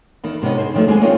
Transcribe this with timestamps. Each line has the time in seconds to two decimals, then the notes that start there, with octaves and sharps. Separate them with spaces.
0.24 E2 D#3 D#4
0.42 G#2 C3 B3 C#4 D#4
0.58 D#4 G#4 C5
0.75 D#3 F3 F#3 A3 D#4
0.87 D#2 G#3 C4 G#4 G#5
1.02 C4 D#4 F4 G#4 A#4 C#5